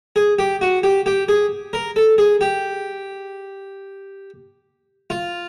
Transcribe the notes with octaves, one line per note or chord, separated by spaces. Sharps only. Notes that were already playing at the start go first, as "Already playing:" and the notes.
G#4
G4
F#4
G4
G4
G#4
A#4
A4
G#4
G4
F4